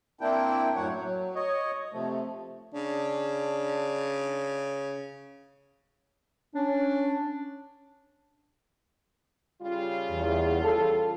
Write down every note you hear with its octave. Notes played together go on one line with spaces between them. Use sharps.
A#3 C4 D4 E4 G5
F#2 A2 F#3 C#5 F#5
F#3
C#5 D#5
C3 F3 A3
C#3 D4
C#4 D4
C#3 G3 F4
E2
A4